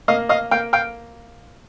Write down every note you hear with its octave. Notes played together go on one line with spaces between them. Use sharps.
A#3 D#5 F5
D#5 F5
A#3 F5 G5
F5 G5